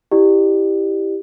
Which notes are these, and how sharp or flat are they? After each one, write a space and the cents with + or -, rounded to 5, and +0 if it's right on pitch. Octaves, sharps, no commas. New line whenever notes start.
E4 +0 G4 +0 D5 +35